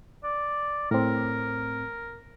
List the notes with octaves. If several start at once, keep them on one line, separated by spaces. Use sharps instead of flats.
D5
A2 C4 A#4